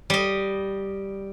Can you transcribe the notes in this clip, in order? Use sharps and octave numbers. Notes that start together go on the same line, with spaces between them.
G3 D#5